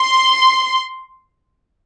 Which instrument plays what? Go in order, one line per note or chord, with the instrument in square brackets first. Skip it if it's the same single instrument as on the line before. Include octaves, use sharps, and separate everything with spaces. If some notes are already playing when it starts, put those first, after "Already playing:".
Already playing: [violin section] C6